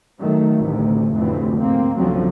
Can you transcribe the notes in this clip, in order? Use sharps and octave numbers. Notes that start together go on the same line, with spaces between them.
D#3 F#3 A3
A1 D2 A2 C3
F1 D2 A2 E3 C4
G#2 A#3 C4
F#1 B1 D3 F3 F#3 C4